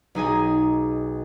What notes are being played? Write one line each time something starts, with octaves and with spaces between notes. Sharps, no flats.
B1 D#4 G#4 G#5